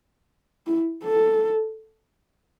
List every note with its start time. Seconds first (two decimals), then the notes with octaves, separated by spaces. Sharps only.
0.67 E4
1.04 A4